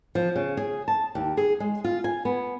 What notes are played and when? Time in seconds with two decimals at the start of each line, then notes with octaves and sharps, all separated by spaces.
0.15 F3
0.36 C#3
0.57 G#4
0.88 A5
1.15 D#2
1.37 G#4
1.60 G#3
1.84 F4
2.04 G#5
2.25 B3